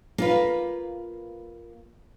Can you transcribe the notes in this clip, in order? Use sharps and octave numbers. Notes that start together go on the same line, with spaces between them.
A#3 F4 B4